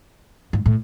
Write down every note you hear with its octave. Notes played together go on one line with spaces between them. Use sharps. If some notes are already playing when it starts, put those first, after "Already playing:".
G#2
A2